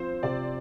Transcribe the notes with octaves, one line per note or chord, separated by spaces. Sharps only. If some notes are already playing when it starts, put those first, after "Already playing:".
Already playing: F3 C4 C5
C3 D5